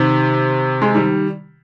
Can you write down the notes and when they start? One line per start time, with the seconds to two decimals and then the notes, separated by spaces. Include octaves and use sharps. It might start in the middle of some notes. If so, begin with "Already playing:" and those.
Already playing: C3 D#3
0.82 G#3
0.95 D#3 G3